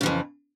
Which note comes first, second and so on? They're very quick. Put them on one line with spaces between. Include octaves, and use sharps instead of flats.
C#3 E3 F2